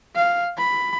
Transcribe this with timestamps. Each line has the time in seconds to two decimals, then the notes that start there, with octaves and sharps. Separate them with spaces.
0.15 F5
0.58 B5